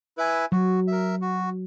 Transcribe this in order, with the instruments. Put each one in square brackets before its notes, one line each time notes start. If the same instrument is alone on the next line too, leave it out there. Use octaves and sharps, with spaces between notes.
[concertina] E4 B4 E5 G#5
[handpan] F#3 [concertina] F#4
[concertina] A#4 E5
F#4